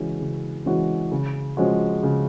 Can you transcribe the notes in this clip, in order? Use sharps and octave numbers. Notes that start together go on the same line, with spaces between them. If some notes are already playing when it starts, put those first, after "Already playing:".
Already playing: C#3 E3 G#3 C#4 F#4
C#3
E3 G#3 C#4 F#4
C#3
F3 G#3 C#4 F#4
C#3